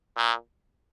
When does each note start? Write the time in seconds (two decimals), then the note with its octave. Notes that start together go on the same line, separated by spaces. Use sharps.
0.17 A#2